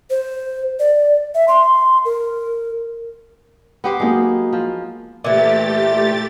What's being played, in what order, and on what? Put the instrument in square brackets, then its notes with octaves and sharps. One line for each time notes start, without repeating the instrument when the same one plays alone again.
[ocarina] C5
D5
E5
C6
A#4
[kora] B3 G4 C5
[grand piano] F#3 A#3 [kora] G#3 D#4
[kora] F3
[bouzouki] A#2 E3 [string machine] A3 G4 A6